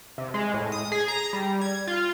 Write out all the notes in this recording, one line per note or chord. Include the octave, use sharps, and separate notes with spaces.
C3
G#3
A2
D#6
G#4
A#5
G3
G#6
F4